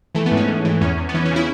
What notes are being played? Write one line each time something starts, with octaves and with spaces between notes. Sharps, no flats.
E3 A3
B3
G#2
C#4
G#2
E3
E2 C#4
E2
B3
E3 C#4
C#4
C#3
E4